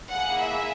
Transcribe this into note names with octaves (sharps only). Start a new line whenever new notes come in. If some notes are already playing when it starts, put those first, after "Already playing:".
A#3 E4 G#4 F#5
E5